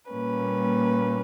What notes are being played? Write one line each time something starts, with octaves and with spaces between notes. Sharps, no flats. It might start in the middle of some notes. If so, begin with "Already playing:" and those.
A#2 G3 A#3 C#4 B4